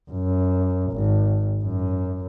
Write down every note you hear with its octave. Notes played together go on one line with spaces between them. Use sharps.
F#2
G#1
F#2